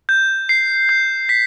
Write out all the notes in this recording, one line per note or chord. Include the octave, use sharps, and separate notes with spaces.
G6
C7
G6
B6